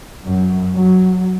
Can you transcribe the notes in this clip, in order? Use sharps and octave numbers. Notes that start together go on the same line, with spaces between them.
F#2 F#3
F#3